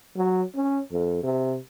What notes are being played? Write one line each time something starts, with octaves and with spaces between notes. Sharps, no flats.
F#3
C#4
F2
C3